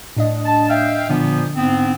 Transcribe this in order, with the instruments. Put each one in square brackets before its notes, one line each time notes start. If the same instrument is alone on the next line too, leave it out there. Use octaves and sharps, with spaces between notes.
[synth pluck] A2 D4 D#5
[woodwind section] A5
E5 F5 G5
[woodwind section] A#2 F3 B3 [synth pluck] D3
[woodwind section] G#2 B3 C4